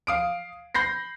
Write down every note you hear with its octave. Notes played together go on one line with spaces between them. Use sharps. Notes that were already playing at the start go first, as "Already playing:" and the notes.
F5 D#6 D7
B5 G6 A#6 C7